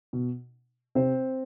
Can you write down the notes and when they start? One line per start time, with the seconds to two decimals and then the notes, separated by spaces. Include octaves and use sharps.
0.13 B2
0.95 C3 C4 C5